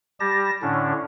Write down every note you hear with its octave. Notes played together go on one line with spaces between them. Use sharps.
G3 G4 A5 A#6
A2 D3 C#4 D4